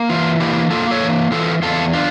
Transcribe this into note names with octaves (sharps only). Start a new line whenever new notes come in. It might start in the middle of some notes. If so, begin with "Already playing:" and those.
Already playing: A#3
E3 F4
A#3 E4 G4
A#3 F4 A4
A4 C#5
E3
E3 F4 A4
E2 F4 A4
D4 F4